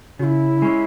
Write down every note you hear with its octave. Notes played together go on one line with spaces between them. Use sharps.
C#3 E4 F#4
G#3 C#4 G#4